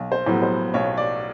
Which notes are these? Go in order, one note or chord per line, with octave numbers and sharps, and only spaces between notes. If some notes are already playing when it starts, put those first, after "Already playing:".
Already playing: B1
C5
A2 F#3 B3
C5
B1 C#5
D5